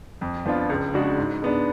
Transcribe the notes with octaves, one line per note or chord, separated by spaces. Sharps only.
F2
F3 B3 D4 F4
C#2
C#3 G#3 D4 F#4
G#2
G#3 B3 D4